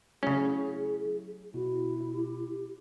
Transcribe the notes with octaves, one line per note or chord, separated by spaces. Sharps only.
C#3 F#3 A3 C#4 E4 G#4
B2 E4 F#4
G4